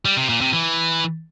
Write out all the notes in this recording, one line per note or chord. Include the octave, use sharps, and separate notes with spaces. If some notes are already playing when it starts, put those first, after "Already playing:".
G3
C3
A#2
C3
E3